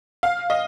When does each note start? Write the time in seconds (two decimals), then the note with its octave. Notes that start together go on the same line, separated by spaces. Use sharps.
0.23 F5
0.50 D#5